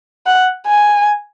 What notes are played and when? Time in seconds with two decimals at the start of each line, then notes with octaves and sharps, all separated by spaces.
0.26 F#5
0.68 G#5